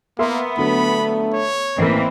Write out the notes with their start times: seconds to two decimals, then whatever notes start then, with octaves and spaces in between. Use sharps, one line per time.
0.19 A#3 B3 A#4 E5 C6
0.57 D3 F#3 A3 B5
1.34 C#5
1.78 A1 E3 A#3 C4 A#4